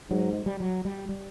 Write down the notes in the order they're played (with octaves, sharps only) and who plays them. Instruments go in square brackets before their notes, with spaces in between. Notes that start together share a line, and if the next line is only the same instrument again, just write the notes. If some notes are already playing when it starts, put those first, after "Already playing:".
[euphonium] G#2 [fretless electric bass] F#3
[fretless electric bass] G#3
G3
F#3
G3
G3